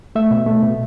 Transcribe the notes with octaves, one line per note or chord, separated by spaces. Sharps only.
A3 E5
B2
A3
B2